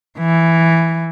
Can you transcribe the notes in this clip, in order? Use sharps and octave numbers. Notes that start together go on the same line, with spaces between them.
E3